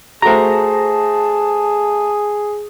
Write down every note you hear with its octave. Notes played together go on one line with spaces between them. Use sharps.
A3 F#4 G#4 C5 A5 A#5